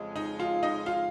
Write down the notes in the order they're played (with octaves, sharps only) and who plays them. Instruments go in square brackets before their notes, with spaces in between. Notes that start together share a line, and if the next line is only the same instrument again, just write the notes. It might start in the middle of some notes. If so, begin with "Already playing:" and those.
Already playing: [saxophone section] F2 C#3 G#3
[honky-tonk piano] D#4
F4
D#4 D#5
F4 F5